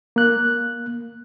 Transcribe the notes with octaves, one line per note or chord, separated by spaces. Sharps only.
A#3 F#6